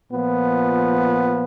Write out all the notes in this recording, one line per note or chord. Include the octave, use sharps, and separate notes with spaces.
A#2 F3 B3